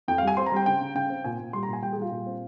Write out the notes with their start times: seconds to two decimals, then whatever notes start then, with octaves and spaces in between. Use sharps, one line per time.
0.08 F2 G5
0.18 F5
0.23 G3 G#5
0.37 C4 C6
0.46 A#5
0.52 G3 G5
0.66 C#3 G5
0.81 C#3
0.95 C#3 G5
1.10 C4
1.24 A#2 G#5
1.40 A#2
1.53 G3 C6
1.63 A#5
1.68 A#2 G#5
1.83 G3 G5
1.92 G#4
1.98 G3 F4
2.11 A#2
2.27 C4